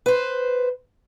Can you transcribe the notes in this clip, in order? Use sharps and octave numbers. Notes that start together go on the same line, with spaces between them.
B4 C5